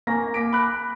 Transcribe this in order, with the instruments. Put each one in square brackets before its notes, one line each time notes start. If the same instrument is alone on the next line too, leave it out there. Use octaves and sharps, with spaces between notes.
[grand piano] A#3 G#5 C#6 A#6
D6 B6 D7
B5 F#6